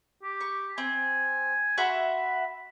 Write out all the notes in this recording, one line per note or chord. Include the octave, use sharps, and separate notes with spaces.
G4
C#6
C4 G#5
F#4 E5 B5 C6